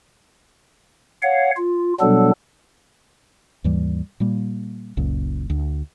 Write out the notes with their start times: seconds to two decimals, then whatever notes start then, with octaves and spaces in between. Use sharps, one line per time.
1.23 C#5 F5 F#5
1.57 F4
2.00 B2 F#3 G3 B3 D4 A4
3.64 D#2 G#2 E3 G3
4.20 A#2 G3 A#3
4.97 F#1 C#2 A#2
5.50 D2